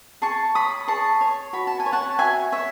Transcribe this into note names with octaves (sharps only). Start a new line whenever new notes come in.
G#4 A5 C#6
C#5 B5 D#6
G#4 A5 C#6
C#5
F#4 B5
A5
G#5
C#5
F#5 A5
F#4 E5 G#5
C#5 E5